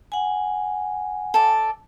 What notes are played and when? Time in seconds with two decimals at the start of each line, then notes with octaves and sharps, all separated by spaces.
0.12 F#5 G#5
1.34 A4 D5